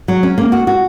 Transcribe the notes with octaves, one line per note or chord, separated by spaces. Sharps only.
F#3
C#4
A#3
F#4
F#4